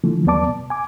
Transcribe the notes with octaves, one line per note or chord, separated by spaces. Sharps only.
D3 E3 F3 A3
D#2 F#3 B3 D5 A5 D6
B2
G#5 D6